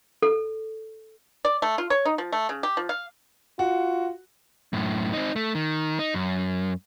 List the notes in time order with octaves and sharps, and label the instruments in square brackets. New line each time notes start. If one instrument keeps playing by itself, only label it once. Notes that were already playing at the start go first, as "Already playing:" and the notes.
[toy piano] A4
[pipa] D5
A3
F4
C#5
D#4
F3
A3
C#3
G4
F3
F5
[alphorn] F4 [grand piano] F#4
[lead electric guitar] F#2 A2
C4 D#4
A3
D#3
D#4
F#2